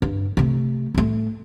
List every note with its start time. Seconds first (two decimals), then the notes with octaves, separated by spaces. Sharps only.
0.02 G2
0.37 C3 A3
0.94 A2 A3